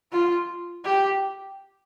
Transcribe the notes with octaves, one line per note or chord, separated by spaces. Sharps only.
F4
G4